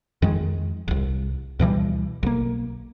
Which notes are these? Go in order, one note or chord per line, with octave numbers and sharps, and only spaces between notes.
F2 D#3 G#3
E1 C2
D2 B2 E3 G3
B1 A#3